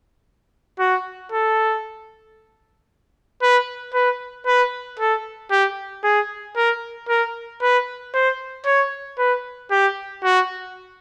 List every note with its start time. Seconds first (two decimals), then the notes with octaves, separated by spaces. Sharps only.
0.79 F#4
1.32 A4
3.42 B4
3.94 B4
4.47 B4
5.00 A4
5.51 G4
6.04 G#4
6.57 A#4
7.09 A#4
7.62 B4
8.14 C5
8.66 C#5
9.19 B4
9.71 G4
10.24 F#4